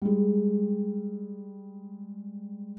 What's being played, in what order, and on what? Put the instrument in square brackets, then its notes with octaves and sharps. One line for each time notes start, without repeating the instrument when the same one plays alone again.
[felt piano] G3 G#3